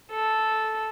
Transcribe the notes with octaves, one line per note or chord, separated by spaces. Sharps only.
A4